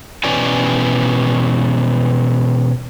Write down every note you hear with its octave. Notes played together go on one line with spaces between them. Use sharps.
B2 E3 C#4 G4 D5 G#5